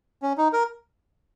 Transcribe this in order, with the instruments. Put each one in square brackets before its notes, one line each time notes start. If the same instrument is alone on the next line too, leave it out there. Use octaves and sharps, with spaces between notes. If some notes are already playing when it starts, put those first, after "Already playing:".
[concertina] C#4
D#4
A#4